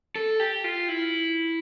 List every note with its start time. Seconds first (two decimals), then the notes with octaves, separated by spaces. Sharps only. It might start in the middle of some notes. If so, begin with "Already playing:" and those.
0.16 A4
0.40 G4
0.64 F4
0.89 E4